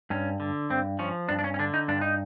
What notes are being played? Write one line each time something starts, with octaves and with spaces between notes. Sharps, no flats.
G2 C#4
D3
G2 C4
F3 C#4
G2 D4
D4
C#4
C#4
D3 D4
D#4
G2 D4
D#4